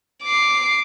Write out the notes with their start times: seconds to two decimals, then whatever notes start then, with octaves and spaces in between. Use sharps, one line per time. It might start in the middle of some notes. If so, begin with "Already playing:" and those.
0.23 D6 C7